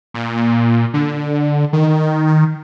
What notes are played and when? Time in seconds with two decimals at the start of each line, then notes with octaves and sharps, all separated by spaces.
0.14 A#2
0.94 D3
1.73 D#3